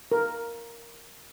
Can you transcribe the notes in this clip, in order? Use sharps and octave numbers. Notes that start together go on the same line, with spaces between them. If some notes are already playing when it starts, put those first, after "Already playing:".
A#4